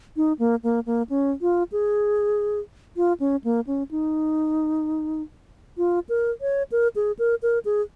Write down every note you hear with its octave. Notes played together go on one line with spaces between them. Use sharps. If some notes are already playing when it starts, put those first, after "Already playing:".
D#4
A#3
A#3
A#3
C#4
F4
G#4
F4
C#4
A#3
C#4
D#4
F4
A#4
C#5
A#4
G#4
A#4
A#4
G#4